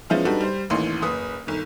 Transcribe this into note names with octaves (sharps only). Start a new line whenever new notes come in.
F3 G#3 B3 C#4 E4 F4
G3 D4 D#4 F#4 A4 B4
G3 C5
A1 D#2 E3 C6
F#1 B4 D#6
G1 D#3